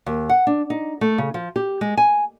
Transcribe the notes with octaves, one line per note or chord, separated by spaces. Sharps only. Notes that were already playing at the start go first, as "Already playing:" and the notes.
D#2
F#5
D4
D#4
A3
C#3
F3
G4
G#3
G#5